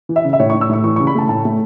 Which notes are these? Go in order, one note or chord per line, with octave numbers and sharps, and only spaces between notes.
E3
E5
C#3
E5
A2 C#5
A2 C#6
E6
A2 C#6
E3 C#6
C#3 C#6
B5
A3 A5
A2 A5
A3